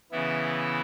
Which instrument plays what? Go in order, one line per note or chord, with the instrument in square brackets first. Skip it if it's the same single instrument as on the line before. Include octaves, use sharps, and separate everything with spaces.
[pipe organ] C#3 E3 B3 E4